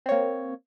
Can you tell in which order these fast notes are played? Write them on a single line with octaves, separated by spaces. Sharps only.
C4 C#5 A#3